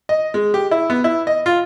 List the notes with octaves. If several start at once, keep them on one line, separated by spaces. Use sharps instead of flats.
D#5
G#3
G4
E4
B3
E4
D#5
F4